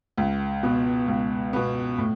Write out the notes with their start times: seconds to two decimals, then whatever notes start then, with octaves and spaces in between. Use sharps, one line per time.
0.18 C#2
0.63 B2 B3
1.08 C#2
1.53 B2 B3
1.98 A2